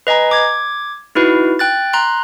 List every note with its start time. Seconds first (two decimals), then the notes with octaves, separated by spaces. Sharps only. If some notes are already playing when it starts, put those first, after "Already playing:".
0.07 B4 D#5 G#5 A#5
0.31 D6 G#6
1.15 D#4 E4 F#4 B4
1.59 G5 F#6 A6
1.93 A#5 C6 F#6